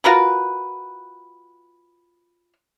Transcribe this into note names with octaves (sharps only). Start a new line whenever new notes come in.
F4 F#4 A#4 B4